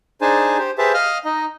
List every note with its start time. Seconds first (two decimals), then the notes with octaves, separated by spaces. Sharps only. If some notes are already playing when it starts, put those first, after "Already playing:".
0.21 D4 D#4 G#4 C5 G#5 A5
0.58 G4 C5
0.78 G4 G#4 B4 C5 E5 A5
0.94 D#5 F5 D#6 F6
1.25 D#4 D#5